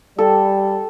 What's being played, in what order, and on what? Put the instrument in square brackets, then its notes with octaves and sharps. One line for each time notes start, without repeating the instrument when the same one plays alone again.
[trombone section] G3 [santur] A4